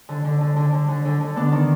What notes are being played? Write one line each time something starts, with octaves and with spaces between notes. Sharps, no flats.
D3
D3
D3
D3
D3
D3
D3
D3
B3 D4
D#3